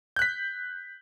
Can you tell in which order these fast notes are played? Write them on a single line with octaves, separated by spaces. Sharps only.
G6 F#6 B6